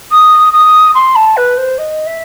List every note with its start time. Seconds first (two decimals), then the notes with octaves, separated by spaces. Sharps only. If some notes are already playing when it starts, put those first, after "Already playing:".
0.11 D#6
0.53 D#6
0.94 C6
1.16 A5
1.37 B4
1.57 C5
1.78 D#5
2.06 E5